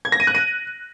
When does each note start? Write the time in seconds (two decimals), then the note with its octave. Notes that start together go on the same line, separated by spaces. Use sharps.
0.05 G#6
0.12 A#6
0.20 D#7
0.27 F#6
0.35 D#7